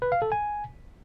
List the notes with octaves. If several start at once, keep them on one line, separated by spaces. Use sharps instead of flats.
B4
F5
A4
G#5